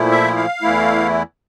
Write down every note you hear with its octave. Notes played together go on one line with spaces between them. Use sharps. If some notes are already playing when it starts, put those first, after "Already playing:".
Already playing: A#2 F3 A3 E4
E5
F5
E2 E3 A3 E4